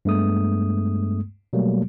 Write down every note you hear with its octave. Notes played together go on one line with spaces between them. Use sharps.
G2 G#3 A3 B3 D#6
B2 F#3 G3 A3 A#3